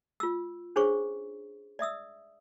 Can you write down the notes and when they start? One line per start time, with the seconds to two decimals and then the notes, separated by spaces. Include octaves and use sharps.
0.20 F4 E6
0.76 C#4 D4 G#4 C5 C#5 C#6
1.79 D5 E5 D#6 E6